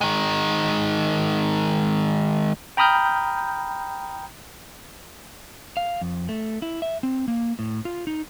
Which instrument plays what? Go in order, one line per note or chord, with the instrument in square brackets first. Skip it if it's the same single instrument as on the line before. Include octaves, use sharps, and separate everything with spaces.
[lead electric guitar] D#3 G#3
[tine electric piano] G5 A#5 B5 D#6 F6 G6
[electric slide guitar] F5
F2
A3
E4
E5
C4
A#3
A2
F4
D#4